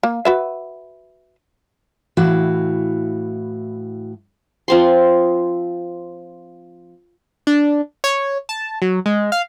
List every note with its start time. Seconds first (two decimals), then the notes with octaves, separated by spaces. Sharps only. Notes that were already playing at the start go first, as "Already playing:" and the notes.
0.03 A#3
0.25 F#4 B4 E5
2.17 A2 E3 E4 F#4 F5
4.68 F3 C4 C6
7.47 D4
8.04 C#5
8.49 A5
8.82 F#3
9.06 G#3
9.32 F5